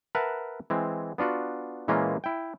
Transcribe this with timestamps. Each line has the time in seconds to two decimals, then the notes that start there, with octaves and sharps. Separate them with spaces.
0.15 A#4 B4 E5 F#5 A5
0.70 E3 G#3 C4
1.18 B3 D4 F4 F#4
1.88 A#2 E3 G#3 A#3 C#4 F4
2.24 E4 G5